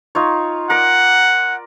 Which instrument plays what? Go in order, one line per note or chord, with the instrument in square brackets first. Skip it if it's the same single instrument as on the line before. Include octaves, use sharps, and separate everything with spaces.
[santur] D#4 F4 C#5
[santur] A#4 D5 [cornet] F#5